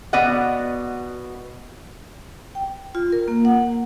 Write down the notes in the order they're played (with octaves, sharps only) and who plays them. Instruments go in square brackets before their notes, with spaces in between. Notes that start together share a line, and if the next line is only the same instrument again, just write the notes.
[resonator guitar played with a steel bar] B2 B3 D5 D#5 F#5
[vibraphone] G5
F4
A#4
A#3
F#5